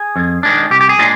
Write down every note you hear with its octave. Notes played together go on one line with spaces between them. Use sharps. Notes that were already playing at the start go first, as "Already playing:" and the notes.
Already playing: G#4
F2
D#3 G#3 D4
C2 G4
G4
G#4
A#2 G#3 D4